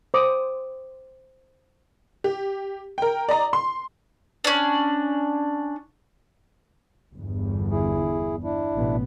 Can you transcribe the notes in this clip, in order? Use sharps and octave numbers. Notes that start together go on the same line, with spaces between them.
C5 D6 D#6
G4
A#4 G5
D5 D#5 A#5
C6
C#4 D4
G1 E2
E4 G#4
D4 E4
A1 B2 B3